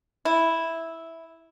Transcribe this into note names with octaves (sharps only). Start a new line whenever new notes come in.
E4